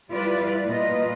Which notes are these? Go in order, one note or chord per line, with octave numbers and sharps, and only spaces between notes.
G3 E4 F4 B4 D5
A#2 F4 B4 D#5